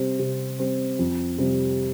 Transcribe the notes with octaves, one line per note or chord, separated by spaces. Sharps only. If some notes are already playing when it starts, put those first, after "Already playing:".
Already playing: C3 G3 C4
C3
G3 C4
F2
C3 G3 C4